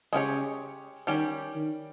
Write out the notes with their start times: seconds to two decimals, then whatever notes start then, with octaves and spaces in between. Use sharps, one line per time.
0.13 C#3 G#3 C#4 G4 C#5
1.07 D#3 G3 C#4 G4
1.55 D#3